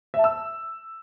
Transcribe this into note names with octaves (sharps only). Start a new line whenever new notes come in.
E5
A5
E6